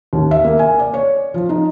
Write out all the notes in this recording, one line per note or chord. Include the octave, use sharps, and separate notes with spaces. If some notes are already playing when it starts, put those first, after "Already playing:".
D#2
E5
A#3
G#5
D5
C#5
F3
D#4